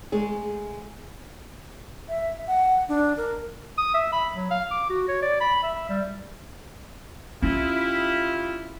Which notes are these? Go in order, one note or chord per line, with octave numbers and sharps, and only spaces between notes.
G#3 A3 G#4
E5
F#5
D4
A#4
D#6
E5
B5
F#3
F5
D6
F#4
C#5
D5
B5
E5
G3
C#4 E4 F4 G4